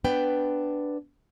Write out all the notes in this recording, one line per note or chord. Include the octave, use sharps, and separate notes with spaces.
B3 D4 B4 G5